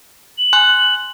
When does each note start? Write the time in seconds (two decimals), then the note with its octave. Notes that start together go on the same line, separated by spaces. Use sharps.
0.38 F#7
0.53 G#5 C6 F#6